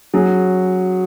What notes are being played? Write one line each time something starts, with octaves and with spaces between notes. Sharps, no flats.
F#3 C#4 G#4